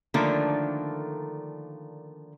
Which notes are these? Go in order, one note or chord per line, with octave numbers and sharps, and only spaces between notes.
D3 D#3 F3 A3 A#3 D4